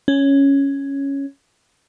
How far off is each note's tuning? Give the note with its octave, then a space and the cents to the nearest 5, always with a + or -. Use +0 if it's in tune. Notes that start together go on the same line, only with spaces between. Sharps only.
C#4 +0